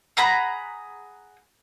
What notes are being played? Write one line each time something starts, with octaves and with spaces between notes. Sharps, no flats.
G#4 F#5 A#5 B5